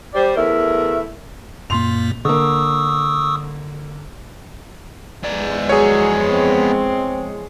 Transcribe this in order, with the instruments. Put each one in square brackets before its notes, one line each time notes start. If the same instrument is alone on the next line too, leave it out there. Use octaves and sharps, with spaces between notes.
[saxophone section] G3 G4 C5 D5
E2 A3 E4 A#4
[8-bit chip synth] F#2 A#2 A#3 [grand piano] C6 F7
[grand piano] D3 A#3 [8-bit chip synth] C#6 D#6 E6
[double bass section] E2 F3 G#3 [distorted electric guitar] B3 D5
[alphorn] F#3 [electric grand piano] G#4 C#5
[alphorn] C4